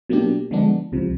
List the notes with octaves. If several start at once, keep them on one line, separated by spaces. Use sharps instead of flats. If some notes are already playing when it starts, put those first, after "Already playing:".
B2 F#3 A#3 D4 G4
D3 F3 G#3 B3 D4
C#2 C3 F3